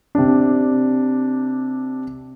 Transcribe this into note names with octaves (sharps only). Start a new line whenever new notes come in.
C3 D4